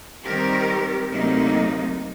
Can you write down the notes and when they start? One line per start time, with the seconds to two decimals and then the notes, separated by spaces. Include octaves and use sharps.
0.25 D#3 G3 C4 G4 A#4
1.11 D2 C3 F#3 A#3 D#4